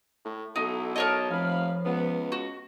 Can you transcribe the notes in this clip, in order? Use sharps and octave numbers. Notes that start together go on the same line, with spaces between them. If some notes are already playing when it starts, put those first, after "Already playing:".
A2
B1 B3 D#4 E4 A4
A#4 C#5 D#5 A5
F1 F3 F5 B5
C#2 B3
F#4